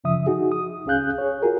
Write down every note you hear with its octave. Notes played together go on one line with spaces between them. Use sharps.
F#2 C#3 F3 E5 D#6
D#4 F#4 G#4
D#6
C#2 C#4 G#4 F5 F#6 G6
G#4 C#5
F4 F#4 G#4 A#4